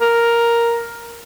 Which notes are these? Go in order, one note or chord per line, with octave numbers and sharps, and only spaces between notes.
A#4